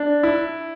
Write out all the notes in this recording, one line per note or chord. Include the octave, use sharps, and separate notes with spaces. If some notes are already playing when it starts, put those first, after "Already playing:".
Already playing: D4
E4